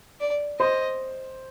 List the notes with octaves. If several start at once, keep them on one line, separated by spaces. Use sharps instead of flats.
D5
C5 D#5